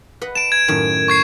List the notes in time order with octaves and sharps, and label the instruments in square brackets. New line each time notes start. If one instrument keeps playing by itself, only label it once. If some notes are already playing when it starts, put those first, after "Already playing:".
[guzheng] B4 D#5 F#5
[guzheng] A5 [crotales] D7 E7
[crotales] G#6
[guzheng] F#2 A2 D#3
[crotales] C#6 G#6 C7